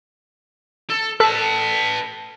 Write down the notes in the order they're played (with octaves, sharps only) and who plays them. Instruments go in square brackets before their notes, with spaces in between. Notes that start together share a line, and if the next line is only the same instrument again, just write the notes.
[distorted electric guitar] A4
[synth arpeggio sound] A4 [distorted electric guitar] B4 A5